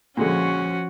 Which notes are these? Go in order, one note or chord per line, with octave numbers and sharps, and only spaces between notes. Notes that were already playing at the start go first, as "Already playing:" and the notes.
A#2 D3 F3 G#3 C#4 F#4